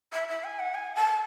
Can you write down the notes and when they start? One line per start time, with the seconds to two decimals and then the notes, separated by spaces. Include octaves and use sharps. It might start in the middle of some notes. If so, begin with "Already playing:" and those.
0.12 E5
0.28 E5
0.43 G#5
0.59 F#5
0.74 G#5
0.95 A5